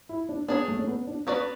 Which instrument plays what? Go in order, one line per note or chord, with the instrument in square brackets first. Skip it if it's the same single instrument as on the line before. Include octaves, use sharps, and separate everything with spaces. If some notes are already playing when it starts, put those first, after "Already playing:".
[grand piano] E4
D4
[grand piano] B3 [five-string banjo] D4 G#4 C#5
[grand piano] A3
C#4
B3
D4
[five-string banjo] B3 F#4 B4 D5 [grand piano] C#4